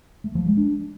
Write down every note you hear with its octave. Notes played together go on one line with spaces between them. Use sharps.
A3
F3
G#3
D4